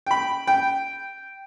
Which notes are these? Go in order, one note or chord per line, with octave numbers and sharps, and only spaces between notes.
G5 B5
G5